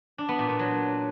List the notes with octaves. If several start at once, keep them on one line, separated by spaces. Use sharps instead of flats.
D4
B3
A#2
A#2
F#3